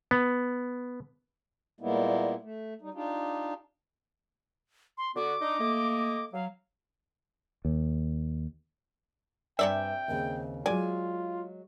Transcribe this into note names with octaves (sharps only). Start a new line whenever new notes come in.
B3
A#2 G3 G#3 A#3 B3 E4
A3
G3 D#4
D4 D#4 F4 G4
C6
D3 B3 F#4 D6
D4 D#4 D#5
A3 A#3 D#5
F#3 F5
D#2
G2 C3 D5 E5 G5 G#5
D#2 C#3 C4
F#3 G#3 F4 D5 G#5